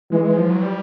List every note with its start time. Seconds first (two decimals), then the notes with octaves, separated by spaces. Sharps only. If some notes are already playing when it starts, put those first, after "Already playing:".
0.12 E3 G#3
0.24 G#3
0.37 F3
0.50 F#3
0.62 G3